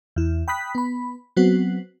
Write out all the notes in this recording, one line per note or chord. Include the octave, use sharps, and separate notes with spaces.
E2 E4
G5 B5 D#6 F#6 B6
B3 B5
F#3 B3 C4 F#4